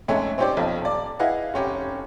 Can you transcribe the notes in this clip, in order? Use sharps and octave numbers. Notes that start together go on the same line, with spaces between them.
F2 G#2 G#3 A3 C#4
C4 C#4 D#4 G4 C5 D5
B1 F2 F3
D#1 D5
E4 G#4 B4 D#5 F5 F#5
F1 C#4 G4